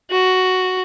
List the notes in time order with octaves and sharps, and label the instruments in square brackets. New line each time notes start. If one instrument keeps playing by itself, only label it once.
[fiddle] F#4